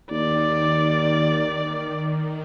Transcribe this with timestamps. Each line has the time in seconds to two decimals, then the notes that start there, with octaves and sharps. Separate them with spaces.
0.11 D#2 D#3 D5